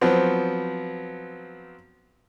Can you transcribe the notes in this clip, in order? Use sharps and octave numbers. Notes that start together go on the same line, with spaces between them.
F3 F#3 B3 C4